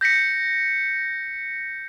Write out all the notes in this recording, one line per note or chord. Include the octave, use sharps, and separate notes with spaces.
G6 A#6 B6 C#7